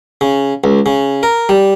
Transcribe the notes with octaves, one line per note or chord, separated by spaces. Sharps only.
C#3
C#2
C#3
A#4
G3